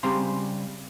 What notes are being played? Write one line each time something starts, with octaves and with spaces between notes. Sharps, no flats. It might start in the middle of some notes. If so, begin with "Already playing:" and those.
C#3 G3 C4 A#5 C6